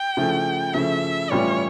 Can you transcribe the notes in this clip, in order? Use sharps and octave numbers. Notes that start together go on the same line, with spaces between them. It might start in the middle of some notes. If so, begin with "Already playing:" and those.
Already playing: G5
C#3 F3 A3 E4
C#3 F3 A3 E4 E5
A2 E3 G3 C#4 F4 C#5